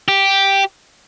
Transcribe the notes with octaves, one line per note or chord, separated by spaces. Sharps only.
G4